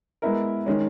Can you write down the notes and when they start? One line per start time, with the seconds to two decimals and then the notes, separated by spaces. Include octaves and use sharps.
0.22 G#3 B3 E4 A#4
0.66 D#3 G#3 C#4